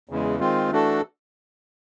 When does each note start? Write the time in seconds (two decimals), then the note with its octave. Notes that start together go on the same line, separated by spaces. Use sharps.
0.09 E2 C#3 E3 G#3
0.39 D#3 G#3 C4 F4
0.70 E3 A3 D4 F#4 A4